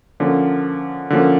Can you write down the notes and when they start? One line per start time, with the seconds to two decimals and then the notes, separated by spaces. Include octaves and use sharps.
0.20 D3 F3 A#3 C#4
1.10 D3 F3 A#3 C#4